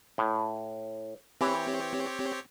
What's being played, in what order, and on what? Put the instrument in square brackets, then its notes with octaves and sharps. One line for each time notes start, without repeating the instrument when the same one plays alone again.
[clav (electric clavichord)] A2
[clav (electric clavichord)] E3 [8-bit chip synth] C4 G4 C#5